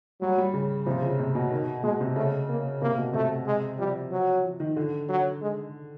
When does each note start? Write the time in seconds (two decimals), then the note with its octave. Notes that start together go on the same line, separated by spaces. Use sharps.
0.21 F#3 G3
0.38 G3
0.54 C#3
0.86 C3 F3
1.02 C#3
1.19 C3
1.35 B2
1.51 D#3
1.83 B2 G#3
2.01 C3
2.16 C#3 A3
2.49 A#3
2.82 C3 A#3
2.98 B2
3.14 C3 A3
3.46 G#3
3.79 F3 G3
4.11 F#3
4.44 F3
4.60 D#3
4.76 D3
5.09 F#3
5.42 G#3